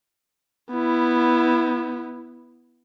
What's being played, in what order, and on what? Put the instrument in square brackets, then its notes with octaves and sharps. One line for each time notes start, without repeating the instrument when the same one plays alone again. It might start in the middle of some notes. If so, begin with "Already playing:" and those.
[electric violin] B3 E4